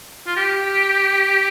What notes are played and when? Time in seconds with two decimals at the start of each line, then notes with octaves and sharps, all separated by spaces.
0.27 F4
0.37 G4